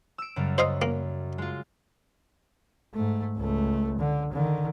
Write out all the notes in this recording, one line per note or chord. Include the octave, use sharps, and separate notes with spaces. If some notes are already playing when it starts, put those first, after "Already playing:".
E6 D7
F#2 C#3 G3
C5 D#5 F5
A#3
G#3 F4
G#2 A3
C#2 A3
D3
D3 D#3